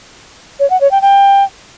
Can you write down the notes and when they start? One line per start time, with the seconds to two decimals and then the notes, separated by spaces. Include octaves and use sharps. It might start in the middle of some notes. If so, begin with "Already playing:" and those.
0.60 C#5
0.70 F#5
0.81 C#5
0.91 G5
1.02 G5